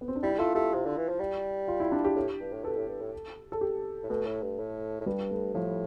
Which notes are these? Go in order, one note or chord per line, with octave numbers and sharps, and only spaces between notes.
B3
C4
D4
G3 E4
E4
A3 F4
A3 G4
C3
D3
E3
F3
G3
F4
E4
D4
G4
A2
G2
A2
B2 A4
A2
G2
A2
A4
G4
A2
B2 A3
A2
G2
A2
A2
G2 G3
A3
A2 F3